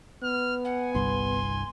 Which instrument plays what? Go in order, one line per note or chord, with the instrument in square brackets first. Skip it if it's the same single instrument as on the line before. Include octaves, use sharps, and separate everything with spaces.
[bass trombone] B3 [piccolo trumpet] F6
[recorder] F#5 [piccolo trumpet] G#5
[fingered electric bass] G1 C2 G2 [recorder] C6